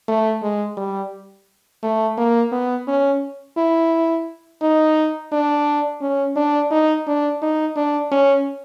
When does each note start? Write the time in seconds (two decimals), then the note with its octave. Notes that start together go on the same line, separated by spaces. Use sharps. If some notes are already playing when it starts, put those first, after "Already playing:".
0.08 A3
0.42 G#3
0.77 G3
1.83 A3
2.17 A#3
2.52 B3
2.87 C#4
3.57 E4
4.62 D#4
5.32 D4
6.02 C#4
6.36 D4
6.71 D#4
7.07 D4
7.42 D#4
7.76 D4
8.12 C#4